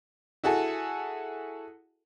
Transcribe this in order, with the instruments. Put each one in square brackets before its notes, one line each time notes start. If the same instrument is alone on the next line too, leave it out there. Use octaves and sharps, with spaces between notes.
[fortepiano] E4 F#4 G#4 A4